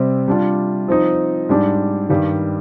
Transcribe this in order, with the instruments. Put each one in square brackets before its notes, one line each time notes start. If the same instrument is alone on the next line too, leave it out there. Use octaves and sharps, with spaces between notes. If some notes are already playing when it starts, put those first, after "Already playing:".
Already playing: [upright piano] C3 G3 C4
G3 D4 F4
F3 C4 D#4
G#2 G3 D4
G2 D#3 G3